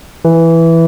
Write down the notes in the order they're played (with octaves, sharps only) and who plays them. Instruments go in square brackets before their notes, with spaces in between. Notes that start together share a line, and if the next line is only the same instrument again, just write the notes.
[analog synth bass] E3